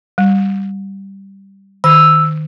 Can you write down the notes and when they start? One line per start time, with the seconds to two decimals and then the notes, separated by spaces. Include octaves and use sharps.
0.18 G3
1.84 D#3 E6